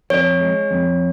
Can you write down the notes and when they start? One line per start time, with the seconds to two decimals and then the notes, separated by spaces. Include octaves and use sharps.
0.10 F2 C#5
0.41 G#3
0.71 F2